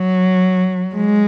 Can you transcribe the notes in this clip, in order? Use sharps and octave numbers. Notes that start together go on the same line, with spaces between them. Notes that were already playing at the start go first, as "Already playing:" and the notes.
Already playing: F#3
G#3